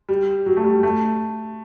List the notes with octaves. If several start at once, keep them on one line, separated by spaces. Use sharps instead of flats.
G3
F#3
A3
G3
A3